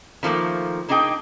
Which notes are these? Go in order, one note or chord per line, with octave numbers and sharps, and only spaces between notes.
D#3 F3 A3 A#3
A#3 D4 D#4 G#4 G5